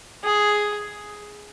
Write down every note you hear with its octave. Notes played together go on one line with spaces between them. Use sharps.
G#4